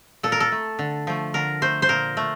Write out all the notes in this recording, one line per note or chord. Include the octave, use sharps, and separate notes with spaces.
A#2 A4
A#4
A4
A3
D3
F3 A3
D3 A#4
A3 C5
C5
A#2 A#4
A3